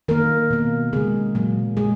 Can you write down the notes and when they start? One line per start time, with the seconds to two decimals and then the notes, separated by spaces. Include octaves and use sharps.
0.08 D#3 A#3 A#4
0.50 B2 A#3
0.93 C#3 G#3 G#4
1.35 A#2 F#3 A#3
1.77 G#3 G#4